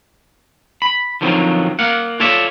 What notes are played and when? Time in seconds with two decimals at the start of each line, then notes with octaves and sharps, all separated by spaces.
0.82 B5
1.21 D3 D#3 F3 F#3 B3 C4
1.79 A#3 F5 F#5
2.20 F4 A4 C#5 D5 E5